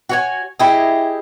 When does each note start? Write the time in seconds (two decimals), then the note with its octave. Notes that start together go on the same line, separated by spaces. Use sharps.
0.09 F#4 C#5 G#5
0.60 E4 G4 G#4 D#5